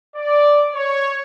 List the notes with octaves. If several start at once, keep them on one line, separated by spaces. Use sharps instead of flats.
D5
C#5